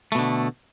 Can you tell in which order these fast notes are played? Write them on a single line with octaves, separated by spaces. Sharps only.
A3 B2 D3